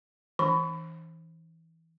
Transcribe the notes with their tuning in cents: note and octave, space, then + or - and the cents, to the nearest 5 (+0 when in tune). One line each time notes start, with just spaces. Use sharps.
E3 -15 D4 -30 B5 +25